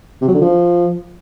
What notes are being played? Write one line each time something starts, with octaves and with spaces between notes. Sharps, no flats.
C3
F#3
D3
F3